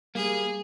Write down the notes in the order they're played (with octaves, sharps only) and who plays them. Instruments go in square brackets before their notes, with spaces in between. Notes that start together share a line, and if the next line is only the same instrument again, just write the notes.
[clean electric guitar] G3 A#3 [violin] G#4